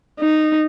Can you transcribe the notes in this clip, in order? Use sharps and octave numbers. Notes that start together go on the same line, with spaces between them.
D#4